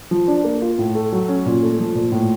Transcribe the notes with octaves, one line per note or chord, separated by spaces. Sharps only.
F3
D4
A#3
F4
A2
A3
F#3
C#4
A#2
A3
F3
A#2
A2